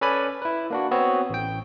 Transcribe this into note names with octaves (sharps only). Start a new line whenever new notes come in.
C#4 A4 B4 D5 G#5 B5
E4 B4
A#3 D4 F#4
B3 C4 F#4 C#5
A1 G5